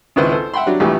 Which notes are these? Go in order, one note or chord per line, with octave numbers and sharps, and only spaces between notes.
G#1 C#2 E4 B4 C5
A4 C5
E5 F#5 G5 B5 C6
F#3 G3 D4
A#1 E3 G3 A3 G4